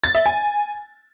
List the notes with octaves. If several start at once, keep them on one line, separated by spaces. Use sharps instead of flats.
A6
E5
G#5